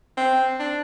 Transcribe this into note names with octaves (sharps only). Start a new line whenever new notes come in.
C4
D4